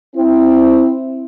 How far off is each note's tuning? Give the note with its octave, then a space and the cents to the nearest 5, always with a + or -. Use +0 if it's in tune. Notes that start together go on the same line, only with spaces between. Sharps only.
C4 +0 E4 +0